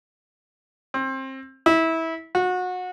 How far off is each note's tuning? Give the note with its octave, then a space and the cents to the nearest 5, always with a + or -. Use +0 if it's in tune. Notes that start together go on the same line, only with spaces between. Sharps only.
C4 +25
E4 -20
F#4 -25